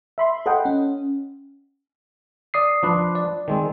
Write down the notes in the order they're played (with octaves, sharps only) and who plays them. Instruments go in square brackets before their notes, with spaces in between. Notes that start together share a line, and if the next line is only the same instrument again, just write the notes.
[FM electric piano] E5 B5 C6
A4 D#5 F#5 G5
C#4
[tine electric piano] D5 D#6 C7
[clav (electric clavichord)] F3 D4 B4
[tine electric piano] D5
[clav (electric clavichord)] D#3 G#3 C4